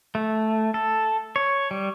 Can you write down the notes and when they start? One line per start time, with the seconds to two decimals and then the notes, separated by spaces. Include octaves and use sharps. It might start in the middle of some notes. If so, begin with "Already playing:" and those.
0.15 A3
0.74 A4
1.36 C#5
1.71 G3